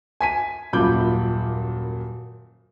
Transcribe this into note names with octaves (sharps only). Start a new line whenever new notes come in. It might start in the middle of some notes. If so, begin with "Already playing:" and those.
G#5 B6 D#7
D#1 F#2 A#2 B5 D6 G6